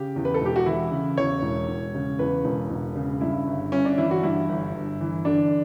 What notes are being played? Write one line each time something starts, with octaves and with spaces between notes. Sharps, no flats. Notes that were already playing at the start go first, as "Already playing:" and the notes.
Already playing: C#3 G4
E2
B4
A4
E1 G4
F#4
E3 E4
C#3
E2 C#5
E1
E1
C#3
E2 B4
E1
E1
C#3
G2 E4
G1
G1 C#4
D4
E3 E4
F#4
G2 E4
G1
G1
E3
D3 D4